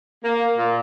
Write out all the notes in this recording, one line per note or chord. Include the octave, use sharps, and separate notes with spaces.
A#3
A#2